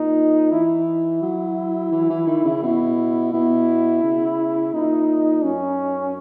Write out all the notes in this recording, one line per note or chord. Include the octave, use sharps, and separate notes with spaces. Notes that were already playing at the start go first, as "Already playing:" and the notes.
Already playing: A#2 D#4
E3 E4
F#3
E3
E3
D#3
C#3
B2 E4
B2 E4
C#3
A#2 D#4
F#2 C#4